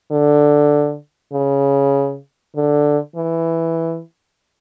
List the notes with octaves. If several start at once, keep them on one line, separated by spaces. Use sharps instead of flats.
D3
C#3
D3
E3